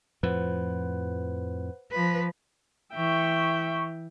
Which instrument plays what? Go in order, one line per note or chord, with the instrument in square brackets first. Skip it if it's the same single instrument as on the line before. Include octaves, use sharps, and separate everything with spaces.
[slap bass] F2 A2 F3 [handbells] B4 C5 F#5
[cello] F3 B4
[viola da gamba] E3 [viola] E5 G5 [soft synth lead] C#6